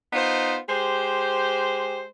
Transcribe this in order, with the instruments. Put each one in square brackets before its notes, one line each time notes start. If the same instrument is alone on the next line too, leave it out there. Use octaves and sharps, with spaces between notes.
[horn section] B3 D#4 F4 C5
G#3 G4 C5